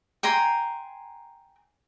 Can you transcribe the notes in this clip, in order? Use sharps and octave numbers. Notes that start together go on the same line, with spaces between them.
G5 G#5 A#5 C6